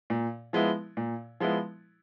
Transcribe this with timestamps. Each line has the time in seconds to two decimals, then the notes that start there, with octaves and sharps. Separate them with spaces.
0.10 A#2
0.53 F3 G#3 B3 E4
0.97 A#2
1.40 F3 G#3 B3 E4